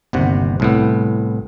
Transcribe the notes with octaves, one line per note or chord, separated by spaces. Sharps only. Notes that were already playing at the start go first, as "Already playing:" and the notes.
G1 D#2 C3 F#5
C2 A2 B3